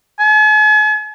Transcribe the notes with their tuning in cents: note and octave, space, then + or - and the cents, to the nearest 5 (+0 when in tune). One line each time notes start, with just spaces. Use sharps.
G#5 +45